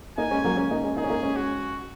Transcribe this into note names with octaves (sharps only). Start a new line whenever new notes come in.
A#3 D#4 G#5
G#3 C#4
F#3 A#3
G#3 C#4
A#3 D#4
G#3 C#4
A#3 D#4 G#4
C#4
A#3 D#4
G#3 C#4
F#4